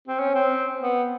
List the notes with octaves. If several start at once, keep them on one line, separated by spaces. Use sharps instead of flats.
C4
C#4
C4
B3